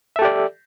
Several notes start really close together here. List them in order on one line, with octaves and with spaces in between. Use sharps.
E5 A4 G4 D5